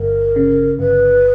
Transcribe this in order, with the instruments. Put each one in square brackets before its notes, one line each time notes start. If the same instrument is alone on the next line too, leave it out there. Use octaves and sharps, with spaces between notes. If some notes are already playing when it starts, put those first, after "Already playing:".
Already playing: [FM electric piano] G1 [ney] A#4
[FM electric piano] C#3
[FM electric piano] G1 [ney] B4